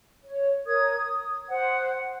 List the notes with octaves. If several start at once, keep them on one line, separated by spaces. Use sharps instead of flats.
C#5
A#4 C#5 D#6 G#6
D#6
C5 F#5